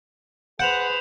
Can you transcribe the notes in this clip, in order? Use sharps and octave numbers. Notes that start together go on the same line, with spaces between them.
G#4 B4 C5 F#5 G6 E7 F7